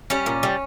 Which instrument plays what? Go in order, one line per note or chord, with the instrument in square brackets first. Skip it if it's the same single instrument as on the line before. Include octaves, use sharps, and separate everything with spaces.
[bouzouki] G3 C#4
A#2
G3